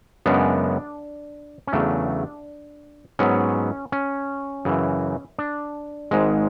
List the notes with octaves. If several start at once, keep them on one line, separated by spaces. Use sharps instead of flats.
F#2 C#3 G#3 B3 D4
C#4
E2 C#3 F#3 A3 D4
G#2 F#3 B3 C#4
C#4
F#2 C#3 E3
D4
G#1 G#2 G#3